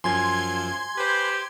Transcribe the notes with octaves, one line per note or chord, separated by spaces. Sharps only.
F#2 F3 G#5 C6 G#6
G4 B4 C5